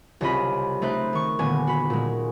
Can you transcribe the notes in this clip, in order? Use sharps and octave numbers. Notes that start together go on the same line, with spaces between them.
C2 C#3 G3 F4 D#5 B5
A3 D#4 C5 B5 F#6
D#3 C#6
D#1 D3 B3 G#5
F#4 B5
A#2 G#3